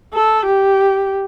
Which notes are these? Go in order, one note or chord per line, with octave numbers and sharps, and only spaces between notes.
A4
G4